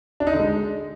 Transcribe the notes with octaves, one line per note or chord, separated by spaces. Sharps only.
D4
D#4
D3
G#3